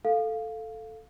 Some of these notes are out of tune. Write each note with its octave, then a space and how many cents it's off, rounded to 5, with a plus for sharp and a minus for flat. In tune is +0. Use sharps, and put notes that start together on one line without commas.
A4 +0 F5 +5